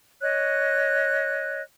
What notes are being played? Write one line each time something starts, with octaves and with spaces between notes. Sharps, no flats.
C#5 D#5 F#6